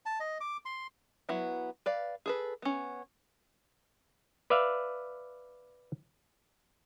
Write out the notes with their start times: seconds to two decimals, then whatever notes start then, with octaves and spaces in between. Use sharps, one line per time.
0.06 A5
0.20 D#5
0.41 D6
0.65 C6
1.29 F#3 B3 E4
1.86 B4 D5 F5
2.26 G#4 A4 B4
2.62 B3 C#4
4.50 B4 D5 E5 F5